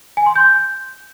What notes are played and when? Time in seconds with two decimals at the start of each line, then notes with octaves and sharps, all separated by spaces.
0.17 G#5
0.26 C6
0.36 G6